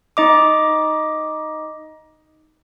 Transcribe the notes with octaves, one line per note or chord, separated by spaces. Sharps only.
D#4 D#5 D6